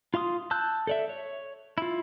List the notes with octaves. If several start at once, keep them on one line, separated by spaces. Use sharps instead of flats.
F4 F5 C6 D#6
A5 E6 F#6 G6
A4 D5 E5
C#5
E4 F4